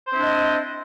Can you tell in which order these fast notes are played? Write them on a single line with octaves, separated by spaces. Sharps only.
C5 C4 E4 D4 D#5